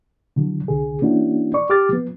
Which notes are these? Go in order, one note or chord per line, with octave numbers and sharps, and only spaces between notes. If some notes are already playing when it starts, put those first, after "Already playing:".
D3 E3 F#3
C2 D3 G#4
E3 A#3 C#4 D4 E4 F#4
D5 C#6
G4 D6 F6 A6
F3 B3